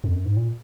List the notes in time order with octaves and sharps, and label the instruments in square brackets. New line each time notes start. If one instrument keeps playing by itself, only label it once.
[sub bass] F2
F#2
G#2
A#2